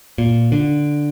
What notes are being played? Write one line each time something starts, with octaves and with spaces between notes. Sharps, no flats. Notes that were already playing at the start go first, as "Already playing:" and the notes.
A#2
D3